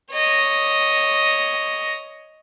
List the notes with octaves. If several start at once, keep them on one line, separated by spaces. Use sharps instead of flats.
C#5 D#5